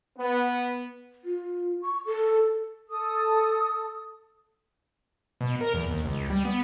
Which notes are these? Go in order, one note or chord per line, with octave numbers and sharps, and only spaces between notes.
B3
F4
C#6
A4
A4 D#6
B2
A#4
E2
D#2
C#2
G3
B3